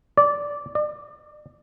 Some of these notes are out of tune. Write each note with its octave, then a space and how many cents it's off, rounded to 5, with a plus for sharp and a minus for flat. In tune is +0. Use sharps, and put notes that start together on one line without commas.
D5 -15
D5 +40